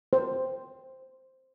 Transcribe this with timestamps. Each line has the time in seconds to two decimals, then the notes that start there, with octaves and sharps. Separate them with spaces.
0.13 C5